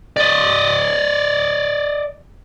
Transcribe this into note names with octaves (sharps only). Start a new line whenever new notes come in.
D5 D#5